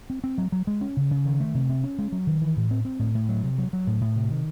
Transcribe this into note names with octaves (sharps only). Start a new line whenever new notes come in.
C4
C4
F#3
F#3
G#3
C#4
C#3
C#3
D#3
A3
C3
C3
C#4
G#3
F#3
D#3
E3
A2
C4
C4
A2
A2
F#3
C3
F#3
F#3
A2
A2
C3
D#3